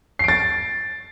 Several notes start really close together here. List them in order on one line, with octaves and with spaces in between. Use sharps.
C7 D7 A6